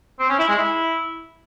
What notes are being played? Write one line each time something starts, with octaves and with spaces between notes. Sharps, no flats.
C4
C#4
E4
G#3
E4